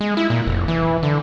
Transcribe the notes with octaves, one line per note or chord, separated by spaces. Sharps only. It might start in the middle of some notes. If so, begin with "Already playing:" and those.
G#3
E4
A#2
F1
E3
D3